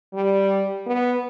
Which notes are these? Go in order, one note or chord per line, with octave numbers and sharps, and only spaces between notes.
G3
B3